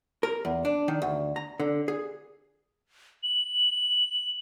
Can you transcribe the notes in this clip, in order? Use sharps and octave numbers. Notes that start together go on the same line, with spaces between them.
A#4
E2
D4
D#3
D2
A#5
D3
G#4
F#7